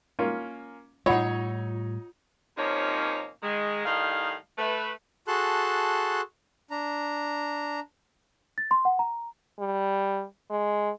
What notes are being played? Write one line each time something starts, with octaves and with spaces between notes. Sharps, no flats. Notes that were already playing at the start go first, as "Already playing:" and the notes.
A#3 C#4 F4
A2 G3 D#4 F4 C#5 F#5 B5
C3 F3 A#3 C#4 D#4 C#5
D#3 G#3
A2 D#3 G3 D#4 F5
A3 B4
F#4 G#4 A4 A5 C6 F#6
D4 A#5
A6
C6
F#5
A#5
G3
G#3